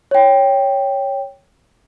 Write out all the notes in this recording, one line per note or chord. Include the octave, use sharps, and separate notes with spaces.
C#5 G5